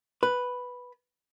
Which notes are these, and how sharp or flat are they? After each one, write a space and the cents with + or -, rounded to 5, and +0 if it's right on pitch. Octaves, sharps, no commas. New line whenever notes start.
B4 +0